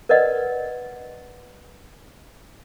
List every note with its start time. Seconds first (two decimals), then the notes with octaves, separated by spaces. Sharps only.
0.09 A#4 B4 D5 D#5 F#5